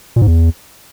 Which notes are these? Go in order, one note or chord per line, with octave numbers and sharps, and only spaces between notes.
A#2
G#2
E2